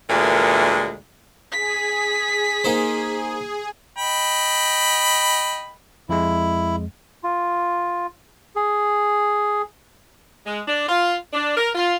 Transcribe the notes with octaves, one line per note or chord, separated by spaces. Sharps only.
D2 A#2 E3 G#3 A#4
G#4 B6
A#3 D#4 C5
D#5 G5 B5
F2 G#3 E4
F4
G#4
G#3
D4
F4
D4
A#4
F4